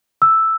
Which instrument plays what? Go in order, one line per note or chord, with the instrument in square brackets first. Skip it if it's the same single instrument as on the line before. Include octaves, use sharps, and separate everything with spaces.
[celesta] E6